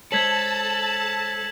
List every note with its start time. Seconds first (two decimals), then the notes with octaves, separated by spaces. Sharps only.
0.12 G#3 A4 C5 C#5 A5 G#6 B6 F#7